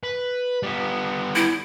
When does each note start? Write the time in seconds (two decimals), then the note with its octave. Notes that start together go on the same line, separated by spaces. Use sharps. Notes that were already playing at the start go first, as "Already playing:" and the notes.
0.04 B4
0.63 G3 B3
1.36 E4